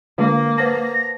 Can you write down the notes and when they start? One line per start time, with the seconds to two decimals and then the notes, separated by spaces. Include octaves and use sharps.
0.18 D3 G#3 A#3 F4
0.58 B4 C5 A5 A#6